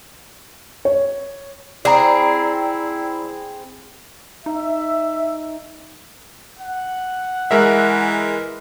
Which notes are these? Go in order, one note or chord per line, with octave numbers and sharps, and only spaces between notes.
C#5
C4 E4 G#4 D5 G5 A#5
D#4 E5
F#5
E3 G#3 A#4 E5